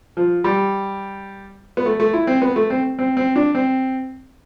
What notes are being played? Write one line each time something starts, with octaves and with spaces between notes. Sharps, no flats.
F3
G3
B3
A3
A3
E4
C4
B3
A3
C4
C4
C4
D4
C4